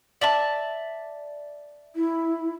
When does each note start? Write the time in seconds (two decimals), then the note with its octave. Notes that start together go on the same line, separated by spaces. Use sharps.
0.21 D5 E5 A5
1.96 E4